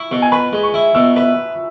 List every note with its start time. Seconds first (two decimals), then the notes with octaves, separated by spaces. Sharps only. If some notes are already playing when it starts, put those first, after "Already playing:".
Already playing: E4 C#6
0.11 B2
0.22 G#5
0.32 B4 B5
0.53 G#3
0.63 C#6
0.74 E4
0.95 B2 E6
1.16 B4 E5